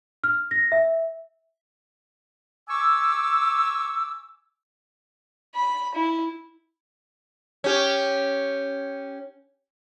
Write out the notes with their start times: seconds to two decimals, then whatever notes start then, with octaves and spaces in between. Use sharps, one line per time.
0.24 F6
0.51 A#6
0.72 E5
2.69 G#5 C#6 D6 E6
5.55 B5
5.95 E4
7.64 C#4 G4